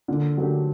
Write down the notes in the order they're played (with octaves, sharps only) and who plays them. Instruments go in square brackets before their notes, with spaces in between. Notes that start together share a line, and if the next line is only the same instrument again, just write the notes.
[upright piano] A#2 [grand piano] D3
[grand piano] D3 [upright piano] F#3 A3 D4 G4